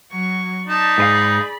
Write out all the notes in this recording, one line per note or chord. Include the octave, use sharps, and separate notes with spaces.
F#3 C#6
D#4 D5 A5 B5
G#2 G#4 B4 F5